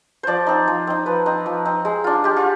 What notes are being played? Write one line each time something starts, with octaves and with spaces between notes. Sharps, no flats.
F3 C5 D5
C4 D#4
F3
C4 D#4
F3 B4
C4 D#4
F3
C4 D#4
G#3
D4 F4
G#3 G4
F4